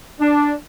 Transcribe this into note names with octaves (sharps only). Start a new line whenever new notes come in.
D4